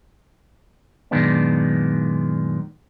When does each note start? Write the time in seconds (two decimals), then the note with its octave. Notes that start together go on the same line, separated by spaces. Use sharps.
1.11 F#2 A#2 D#3 G#3 B3 D4